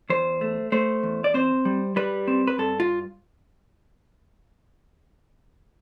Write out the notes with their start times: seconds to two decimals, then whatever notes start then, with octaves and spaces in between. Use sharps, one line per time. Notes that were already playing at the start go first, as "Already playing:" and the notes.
0.10 E2 C5
0.41 A3
0.72 A3 C5
1.03 E2
1.24 D5
1.34 C4 C5
1.65 G3
1.96 G3 B4
2.28 C4
2.48 B4
2.58 G2 A4
2.80 F4